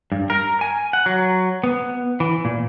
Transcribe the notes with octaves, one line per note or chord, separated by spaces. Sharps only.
G2
A#4
G#5
F#5
F#3
B3
E3
A#2